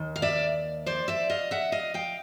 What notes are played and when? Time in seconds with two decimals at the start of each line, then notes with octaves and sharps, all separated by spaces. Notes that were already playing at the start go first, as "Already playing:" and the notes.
Already playing: D#2 D#3
0.16 F5
0.22 D5 E5
0.86 C5 D5
1.08 D5 E5
1.30 D#5 F5
1.51 E5 F#5
1.72 D#5 F5
1.94 F5 G5